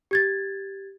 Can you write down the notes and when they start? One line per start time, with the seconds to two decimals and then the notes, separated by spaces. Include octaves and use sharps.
0.11 G4 G#6 A6